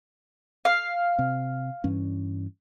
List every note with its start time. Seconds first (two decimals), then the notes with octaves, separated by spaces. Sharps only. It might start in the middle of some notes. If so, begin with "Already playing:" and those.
0.65 F5
1.18 C3 C4
1.84 G2 E3 C#4